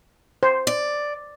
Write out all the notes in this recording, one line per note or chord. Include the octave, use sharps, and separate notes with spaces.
C5
D5